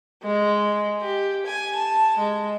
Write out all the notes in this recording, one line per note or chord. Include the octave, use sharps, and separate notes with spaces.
G#3
G4
G#5
A5
G#3